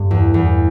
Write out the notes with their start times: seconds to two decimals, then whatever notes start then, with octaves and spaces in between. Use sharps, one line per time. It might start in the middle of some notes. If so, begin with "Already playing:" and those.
Already playing: G2
0.11 E2
0.34 E2